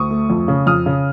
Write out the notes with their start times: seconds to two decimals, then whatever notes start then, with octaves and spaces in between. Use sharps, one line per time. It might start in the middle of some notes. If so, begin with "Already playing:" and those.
Already playing: D2 C#6 D#6
0.10 A3
0.30 F2
0.48 C#3
0.66 F2 D#6 F6
0.86 C#3